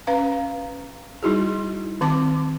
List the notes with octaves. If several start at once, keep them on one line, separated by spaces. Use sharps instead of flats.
C#4 B4 F5 A#5
G3 D#4 E4 F#4 G#4
D#3 C4 A5 D6